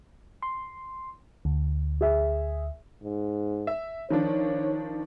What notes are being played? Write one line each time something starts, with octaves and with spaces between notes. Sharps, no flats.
C6
D2
G#4 E5
G#2
E5
D#3 F3 D4 C#5